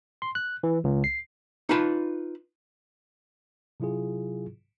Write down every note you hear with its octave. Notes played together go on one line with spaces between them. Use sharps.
C6
F#6
E3
C#2
C7
D#4 F4 B4 A5
C3 F#3 E4 F4 G#4